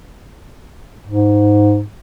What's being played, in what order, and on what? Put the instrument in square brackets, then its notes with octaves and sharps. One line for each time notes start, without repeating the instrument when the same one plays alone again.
[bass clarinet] G#2